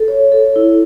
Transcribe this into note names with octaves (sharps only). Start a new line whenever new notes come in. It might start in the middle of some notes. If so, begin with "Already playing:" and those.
Already playing: A4
C#5
A4
E4